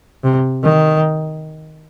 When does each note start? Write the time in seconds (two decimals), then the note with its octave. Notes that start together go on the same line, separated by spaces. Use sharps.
0.24 C3
0.63 D#3